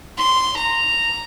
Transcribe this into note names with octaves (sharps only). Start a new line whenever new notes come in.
C6
A#5